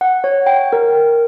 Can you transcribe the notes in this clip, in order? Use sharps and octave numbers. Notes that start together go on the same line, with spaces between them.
F#5
C#5
G5
A#4